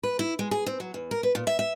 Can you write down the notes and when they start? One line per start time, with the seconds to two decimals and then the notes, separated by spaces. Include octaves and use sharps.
0.03 B4
0.19 E4
0.39 G#3
0.51 G#4
0.66 C4
0.80 F#3
0.94 E2
1.11 A#4
1.23 B4
1.35 A#2
1.47 E5
1.59 E5